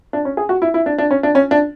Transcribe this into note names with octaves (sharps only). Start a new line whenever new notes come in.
D4
C#4
G#4
F#4
E4
E4
D4
D4
C#4
D4
C#4
D4